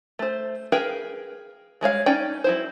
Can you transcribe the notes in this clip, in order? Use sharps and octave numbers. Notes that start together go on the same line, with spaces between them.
A3 C5
G#4 A#4 B4 F5 G5
G3 G#3 C#5 F5
C#4 D#4 D5 G5
F#3 E4 C5